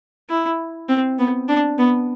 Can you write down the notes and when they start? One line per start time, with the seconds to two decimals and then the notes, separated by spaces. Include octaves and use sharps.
0.29 E4
0.89 C4
1.19 B3
1.48 D4
1.79 B3